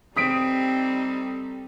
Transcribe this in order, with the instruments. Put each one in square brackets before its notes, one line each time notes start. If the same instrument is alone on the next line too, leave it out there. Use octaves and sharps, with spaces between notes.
[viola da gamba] G3 D#4 A4 [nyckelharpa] C4 [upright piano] D#6 B6 D7